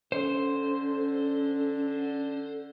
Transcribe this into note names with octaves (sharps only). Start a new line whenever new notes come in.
D3 C#4 A4 C5